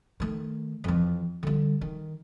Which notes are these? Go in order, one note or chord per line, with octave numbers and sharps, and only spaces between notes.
D#3 A3
F2 E3
D3 G3
D#3